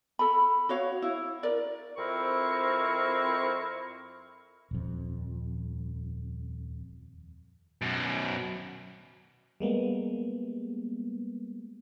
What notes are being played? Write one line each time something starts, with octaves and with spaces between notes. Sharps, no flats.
A4 B5
F#4 C#5 F5
E4
A#4 D5
F2 C4 E4 A#4 C#6
D#1 F2
F#2 B2
G3 G#3 A#3 B3